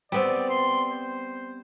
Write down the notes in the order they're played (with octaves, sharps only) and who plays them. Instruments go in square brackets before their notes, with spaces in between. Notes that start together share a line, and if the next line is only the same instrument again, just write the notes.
[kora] G3 B3 C4 [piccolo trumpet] D5
[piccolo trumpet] C6
C5